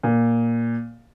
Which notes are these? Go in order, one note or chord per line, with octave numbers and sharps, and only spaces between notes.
A#2